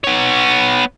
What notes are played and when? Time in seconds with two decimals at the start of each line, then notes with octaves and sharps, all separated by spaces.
0.04 B3 C#5